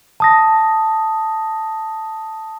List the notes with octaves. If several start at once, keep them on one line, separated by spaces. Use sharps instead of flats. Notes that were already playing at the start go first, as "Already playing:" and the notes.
A5 D#6 A#6